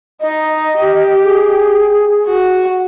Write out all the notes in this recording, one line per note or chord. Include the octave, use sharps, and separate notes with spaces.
D#4 D#5
G4
G#4
F#4